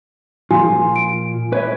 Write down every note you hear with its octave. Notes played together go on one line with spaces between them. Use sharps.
A#2 F3 F4 G#5 C6
D7
B4 C#5 E5